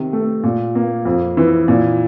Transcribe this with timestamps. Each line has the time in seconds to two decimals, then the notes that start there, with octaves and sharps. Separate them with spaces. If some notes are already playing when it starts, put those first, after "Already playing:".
Already playing: C3 D#3
0.13 A3
0.43 A#2
0.75 A#3
1.05 F2
1.37 E3
1.68 A#2